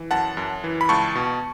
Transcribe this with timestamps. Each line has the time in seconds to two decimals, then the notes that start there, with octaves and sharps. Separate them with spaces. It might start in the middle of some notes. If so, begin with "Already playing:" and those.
Already playing: E3
0.11 F#2 F#5 A5
0.37 F#2
0.64 E3
0.81 B5
0.89 C#2 A5 C#6
1.15 B2